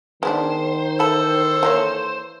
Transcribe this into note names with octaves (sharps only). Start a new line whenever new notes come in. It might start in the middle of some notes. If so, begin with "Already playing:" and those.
D#3 G#3 B3 D4 C5
E3 A4 A5 B5
E3 A#3 C#5